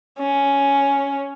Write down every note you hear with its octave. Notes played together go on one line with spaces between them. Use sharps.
C#4